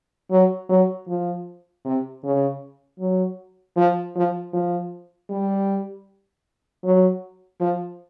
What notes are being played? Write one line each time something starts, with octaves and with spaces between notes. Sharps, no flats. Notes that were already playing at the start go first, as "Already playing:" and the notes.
F#3
F#3
F3
C3
C#3
F#3
F3
F3
F3
G3
F#3
F3